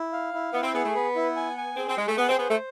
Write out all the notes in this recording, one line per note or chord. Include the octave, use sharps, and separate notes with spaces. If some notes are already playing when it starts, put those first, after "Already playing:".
Already playing: E4
F5
E4
B3 E4
C4
B3 G#4
A3
B3 B4
E4
G#5
G#5
C4 G#4
C4
G#3 G#4
A3
B3 G#4
C4
B3 C5
A3